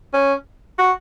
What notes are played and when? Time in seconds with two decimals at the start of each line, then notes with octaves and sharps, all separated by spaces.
0.14 C#4
0.78 F#4